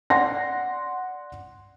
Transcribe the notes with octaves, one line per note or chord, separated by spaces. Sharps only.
D5 F#5 C6 A#6